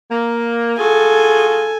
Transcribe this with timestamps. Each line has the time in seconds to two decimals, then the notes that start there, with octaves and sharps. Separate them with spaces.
0.11 A#3
0.78 F4 F#4 G#4 A4 G#5